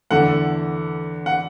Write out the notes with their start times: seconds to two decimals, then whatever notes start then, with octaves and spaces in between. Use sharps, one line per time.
0.10 E2 D3 A3 F#5
1.26 F#5